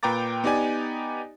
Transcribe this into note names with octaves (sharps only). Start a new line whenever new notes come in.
A#2 B4 G5 A#5 D6 A6
B3 D#4 G4 D5 G#5